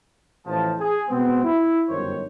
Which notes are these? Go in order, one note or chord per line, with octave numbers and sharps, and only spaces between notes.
A1 F3 A5
G#4
B2 G#3 B3 C4
E4
G1 F#2 D#3 C5 C#5